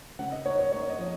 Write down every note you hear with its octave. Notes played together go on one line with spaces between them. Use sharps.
C#3 F#5
D#5
A#3 C#5
C#5
A#3 C#5
D#5
F3